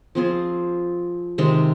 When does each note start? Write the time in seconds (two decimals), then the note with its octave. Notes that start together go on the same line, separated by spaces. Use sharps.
0.15 F3 C4 F4 G#4
1.38 C3 D#3 G#3 C4